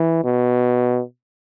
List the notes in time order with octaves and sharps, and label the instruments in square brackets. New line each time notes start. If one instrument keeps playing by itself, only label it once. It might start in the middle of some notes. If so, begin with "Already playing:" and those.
Already playing: [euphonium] E3
B2